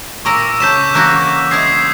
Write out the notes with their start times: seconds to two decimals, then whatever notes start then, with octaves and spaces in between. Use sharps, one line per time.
0.25 A#2 A#4 C#6 D6 E6
0.60 C#3 A5 G6 B6 E7
0.94 E3 A#3 F#4 F#6
1.51 G#3 E4 D#6 G#6 C7